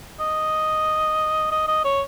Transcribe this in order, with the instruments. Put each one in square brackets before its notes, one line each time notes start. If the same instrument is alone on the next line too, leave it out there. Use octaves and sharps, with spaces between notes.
[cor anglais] D#5
D#5
D#5
C#5